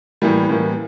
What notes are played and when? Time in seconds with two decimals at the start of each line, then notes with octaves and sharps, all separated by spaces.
0.22 A2 E3 G3 A#3
0.49 A2 E3 G3 A#3